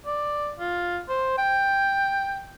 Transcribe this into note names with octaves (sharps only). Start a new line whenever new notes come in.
D5
F4
C5
G5